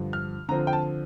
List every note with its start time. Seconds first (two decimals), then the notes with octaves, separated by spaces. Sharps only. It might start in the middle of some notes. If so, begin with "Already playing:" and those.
Already playing: G2 D3 F3
0.13 F6
0.49 D3 F3 C4 A#5
0.67 G5
0.73 A5